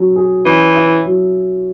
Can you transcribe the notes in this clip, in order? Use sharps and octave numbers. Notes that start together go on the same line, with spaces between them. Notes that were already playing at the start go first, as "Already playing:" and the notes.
Already playing: F#3 C#4
G#4
E3 C#4
E4
F#3